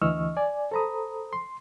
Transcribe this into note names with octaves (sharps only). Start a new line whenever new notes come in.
D2 E3 D#5 C#6 E6 F6
D5 G#5
A4 C5 A#5 B5 D#6
C6